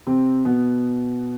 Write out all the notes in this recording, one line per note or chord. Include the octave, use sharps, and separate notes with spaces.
C3 C4
B2 B3